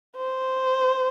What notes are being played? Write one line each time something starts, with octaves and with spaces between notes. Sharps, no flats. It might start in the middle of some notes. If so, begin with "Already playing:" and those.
C5